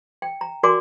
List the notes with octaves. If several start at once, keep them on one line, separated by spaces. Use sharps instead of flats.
G5
A#5
F#4 A#4 D5 G#5 C6 D6